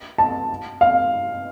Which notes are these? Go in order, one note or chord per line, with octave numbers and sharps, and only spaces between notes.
A5
F5